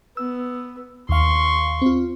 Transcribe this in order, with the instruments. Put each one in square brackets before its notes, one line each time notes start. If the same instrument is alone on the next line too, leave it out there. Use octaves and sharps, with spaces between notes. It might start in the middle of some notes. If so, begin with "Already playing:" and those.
[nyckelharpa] B3 [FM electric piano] E6
[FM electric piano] D#2 F5 [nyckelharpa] C6 C#6
[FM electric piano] C4 F4